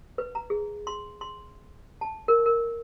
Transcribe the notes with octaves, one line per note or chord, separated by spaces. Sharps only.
B4
A#5
G#4
C6
C6
A5
A#4
A#4